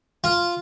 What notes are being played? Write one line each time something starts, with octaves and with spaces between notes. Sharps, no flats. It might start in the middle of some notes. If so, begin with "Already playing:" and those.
F4